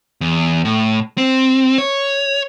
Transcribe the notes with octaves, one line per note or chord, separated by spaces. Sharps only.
E2
A2
C4
C#5